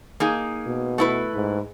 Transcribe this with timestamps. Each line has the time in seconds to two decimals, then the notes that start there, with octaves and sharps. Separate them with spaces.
0.20 A#3 D#4 G#4
0.67 B2
0.98 A3 E4 B4
1.35 G#2